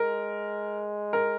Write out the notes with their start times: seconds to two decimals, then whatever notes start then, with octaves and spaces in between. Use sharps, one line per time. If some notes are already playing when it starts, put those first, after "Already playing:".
Already playing: G#3 A#4
1.13 A#4